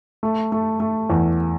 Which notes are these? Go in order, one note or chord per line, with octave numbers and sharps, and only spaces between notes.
A3
A3
A3
E2